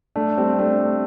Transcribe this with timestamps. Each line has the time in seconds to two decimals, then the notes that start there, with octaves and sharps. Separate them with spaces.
0.16 A3 D4
0.37 G3 C4
0.59 A3 D4